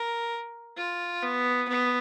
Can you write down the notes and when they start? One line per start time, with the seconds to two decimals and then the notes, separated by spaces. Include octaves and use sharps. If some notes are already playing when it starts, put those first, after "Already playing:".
Already playing: A#4
0.77 F4
1.23 B3
1.68 B3